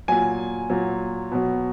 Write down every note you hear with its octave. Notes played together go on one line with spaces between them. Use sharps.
A#2 F#3 G#5
A#2 F#3
B2 F#3